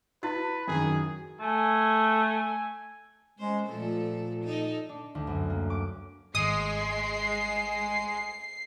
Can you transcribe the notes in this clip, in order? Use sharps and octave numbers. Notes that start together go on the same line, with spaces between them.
E4 F#4 B4 A6
F#2 D#3 G#4
A3 G#5
G#3 C#4 C5
A#2 F3 A3 A4
D#4 A4
D4
D2
F#2
A#3
D6
G#1 G#3 C#6 D#6 C7